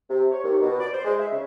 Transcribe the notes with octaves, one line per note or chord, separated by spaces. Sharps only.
C3
C#5
D#2
B2
D5
C5
G#3
E5
C#3